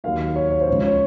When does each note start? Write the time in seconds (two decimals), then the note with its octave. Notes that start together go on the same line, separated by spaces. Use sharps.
0.04 D#2 D#3 F#3 F5
0.36 C#5
0.51 C#5
0.61 C5
0.67 C#2 C#3 F3 C#5
0.84 C#5